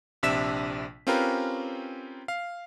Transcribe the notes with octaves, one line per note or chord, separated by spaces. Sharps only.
A#1 C3 D4 E5 B6 E7
C4 C#4 F4 G4 A#4 B4
F5